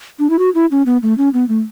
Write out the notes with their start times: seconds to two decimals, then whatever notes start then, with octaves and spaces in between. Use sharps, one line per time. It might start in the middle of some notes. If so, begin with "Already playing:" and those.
0.19 D4
0.30 E4
0.39 F#4
0.55 E4
0.71 C#4
0.86 B3
1.03 A3
1.18 C#4
1.34 B3
1.49 A3